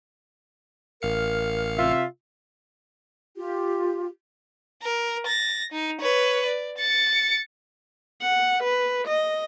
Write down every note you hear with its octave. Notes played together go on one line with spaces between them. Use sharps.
A1 A#4 F5 C#7
C3 F4 E5
F4 G4
A#4
A6 A#6
D#4
B4 C#5
D5
A6 C#7
F#5
B4
D#5